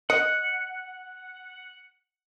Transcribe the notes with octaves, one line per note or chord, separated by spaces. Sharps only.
D#5 F#5